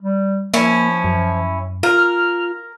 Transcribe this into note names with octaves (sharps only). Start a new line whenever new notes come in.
G3
F3 A#3 C#4 E4
F#2
F4 A#4
F6